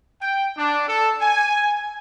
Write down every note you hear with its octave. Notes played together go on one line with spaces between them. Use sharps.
G5
D4
A4
G#5